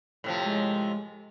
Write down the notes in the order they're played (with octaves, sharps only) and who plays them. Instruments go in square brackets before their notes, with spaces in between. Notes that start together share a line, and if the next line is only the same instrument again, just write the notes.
[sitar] A2 C3 F3
[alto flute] G#3